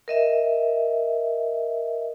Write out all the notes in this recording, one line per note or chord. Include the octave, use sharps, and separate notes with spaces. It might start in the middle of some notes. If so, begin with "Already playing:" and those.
A#4 D#5 E5